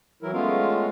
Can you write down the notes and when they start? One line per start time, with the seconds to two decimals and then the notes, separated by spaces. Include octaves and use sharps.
0.22 E3 F#3 E4 A#4
0.33 G#3 A3 B3 C#4 F4 F5